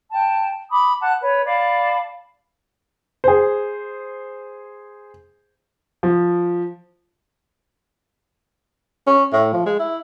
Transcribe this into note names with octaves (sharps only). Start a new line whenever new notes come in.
G5 A5
B5 D6 D#6
F#5 A5 F#6
B4 C#5
D5 F5 A5 B5
G#4 C5
F3
C#4
A2
F3
G#3
E4